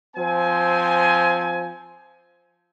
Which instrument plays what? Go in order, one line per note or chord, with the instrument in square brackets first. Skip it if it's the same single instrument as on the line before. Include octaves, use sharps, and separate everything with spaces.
[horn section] F3 C4 G#5